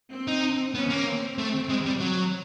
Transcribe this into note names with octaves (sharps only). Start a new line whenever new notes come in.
C4
D#4
B3 C#4
A#3
C4
A3
G#3
G3
F#3